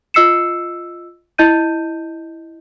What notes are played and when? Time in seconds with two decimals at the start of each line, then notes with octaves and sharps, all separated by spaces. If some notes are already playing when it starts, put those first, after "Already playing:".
0.14 F4 D#5 E6 C7 C#7 E7
1.38 E4 D#5 G6 D#7